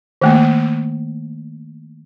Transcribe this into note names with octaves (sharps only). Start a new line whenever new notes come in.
D#3 A3 A#3